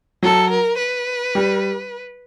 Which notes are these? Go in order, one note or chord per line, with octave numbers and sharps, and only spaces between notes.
F#3 A4
A#4
B4
G3